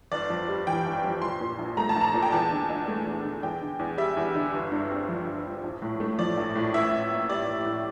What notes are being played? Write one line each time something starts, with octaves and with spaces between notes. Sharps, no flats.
G1 D5
F2
G3
E3 G5
G1
F2
A#1 C6
A#2
A#1
A3 A#5
A5
A#1
A#5
A#2
G5
E2 A5
D3
D4
A3
E2
D3
E2 G5
D3
E2
G3 E5
E2
D3
G1
G2
C4
F3
G1
G2
A#1
A2
A3
F3 D5
A#1
A2
A1 E5
A2
A#3
G3 D5
A1
A2